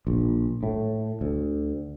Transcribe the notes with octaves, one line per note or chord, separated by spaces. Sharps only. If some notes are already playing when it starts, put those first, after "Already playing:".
A#1
A2
D2